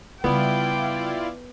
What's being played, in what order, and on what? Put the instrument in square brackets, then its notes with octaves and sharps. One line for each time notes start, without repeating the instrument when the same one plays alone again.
[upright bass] C#3 G3 [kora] B3 [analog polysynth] E4 F4 D5 [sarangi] G5